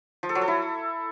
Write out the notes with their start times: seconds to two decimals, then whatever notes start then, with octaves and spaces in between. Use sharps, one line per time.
0.23 F3
0.29 A4
0.35 F#3
0.42 A4
0.48 E4